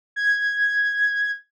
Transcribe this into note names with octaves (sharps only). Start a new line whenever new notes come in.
G#6